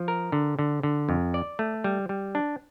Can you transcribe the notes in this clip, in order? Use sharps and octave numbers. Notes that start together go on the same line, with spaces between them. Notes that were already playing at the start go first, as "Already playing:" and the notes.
Already playing: F3
A#4
D3
D3
D3
F2
D5
A3
G3
G3
D4